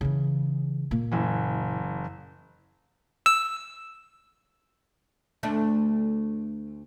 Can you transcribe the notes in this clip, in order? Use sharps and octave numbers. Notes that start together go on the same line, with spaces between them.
C#3 E3
A#2 A#3
F#1 E3
E6
D2 A3 D4